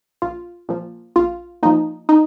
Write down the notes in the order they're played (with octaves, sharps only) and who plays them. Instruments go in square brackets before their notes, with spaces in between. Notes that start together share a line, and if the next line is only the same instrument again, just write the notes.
[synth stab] A#1 F4
A#2 F3
A#1 F4
A#2 F3 D#4
D#4